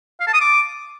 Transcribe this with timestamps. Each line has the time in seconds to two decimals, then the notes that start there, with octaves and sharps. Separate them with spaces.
0.20 F5
0.27 A5
0.34 D#6
0.40 D6